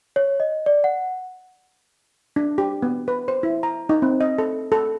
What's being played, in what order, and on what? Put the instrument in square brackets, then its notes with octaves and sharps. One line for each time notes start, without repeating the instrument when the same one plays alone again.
[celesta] C#5
D#5
D5
F#5
[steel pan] D4
G4
B3
B4
C5
E4
A#5
D#4
C4
D#5
A4
A4